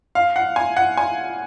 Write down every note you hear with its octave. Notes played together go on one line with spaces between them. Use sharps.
F5
F#5
G#5
F#5
G#5